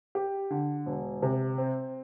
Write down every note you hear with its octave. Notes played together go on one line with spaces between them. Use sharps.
G4
D3
E1
C3
C4